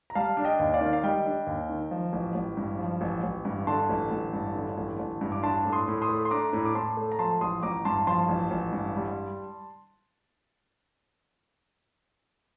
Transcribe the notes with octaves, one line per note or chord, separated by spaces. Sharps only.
A#5
G3 F5 A5
D4
D#5 G5
D#2
D5 F5
D#3
F5
G3 D#5 G5
D4
D#2
D#3
F3
A1
A1
G2
F3
A1
A1
G2
D3 A5 C6
A1
A1
G2
D3
A1
A1
G2
D6
D4 A5 C6
A2
C6 D#6
A2
C6 D#6
A3
C6
D4 A#5 D6
A2
D6
A2 A5 C6
A3
A#5
F3 A5 C6
A1 C6 D#6
A1 A#5 D6
G2 A5 C6
F3 A5 C6
A1
A1
G2
G3